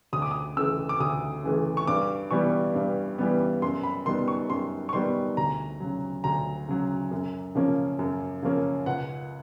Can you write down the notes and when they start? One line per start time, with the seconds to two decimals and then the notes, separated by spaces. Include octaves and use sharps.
0.13 D2 D#6
0.22 D6
0.31 D#6
0.57 C#3 E3 A3 E6
0.89 D6
1.00 D2 D#6
1.43 C#3 E3 A3
1.77 C#6
1.87 G2 D6
2.31 E3 G3 B3 C#6
2.75 G2
3.18 E3 G3 B3
3.62 F#2 C6
3.83 B5
4.06 D#3 G3 B3 C6
4.28 C#6
4.49 F#2 C6
4.89 C#6
4.93 D#3 G3 B3 C6
5.37 D2 A#5
5.80 C#3 F#3
6.24 D2 A#5
6.68 C#3 F#3
7.11 F#2
7.55 C#3 F3 A#3 C#4
7.99 F#2
8.42 C#3 F3 A#3 C#4
8.86 C#2 F#5